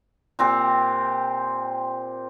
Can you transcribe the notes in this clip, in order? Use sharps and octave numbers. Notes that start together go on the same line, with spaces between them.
A#2 C4 G4